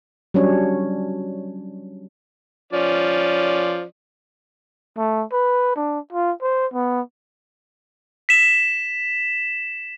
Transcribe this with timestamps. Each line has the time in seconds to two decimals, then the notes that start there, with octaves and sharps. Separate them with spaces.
0.34 F#3 G3 C#4 D4 C#5
2.73 F3 C#4 D5
4.98 A3
5.32 B4
5.76 D4
6.13 F4
6.42 C5
6.74 B3
8.29 B6 E7